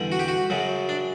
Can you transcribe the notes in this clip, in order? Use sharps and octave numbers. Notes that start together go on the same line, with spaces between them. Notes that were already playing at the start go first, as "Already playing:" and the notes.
Already playing: E2 D3 G3
F#4
G4
F#4
F#2 C#3 F#3
D4